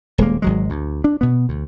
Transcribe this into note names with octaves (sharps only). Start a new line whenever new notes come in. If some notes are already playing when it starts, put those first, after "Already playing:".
D#1 G#3 A#3
G#1 F#3 G#3
D2
D4
B2 B3
D2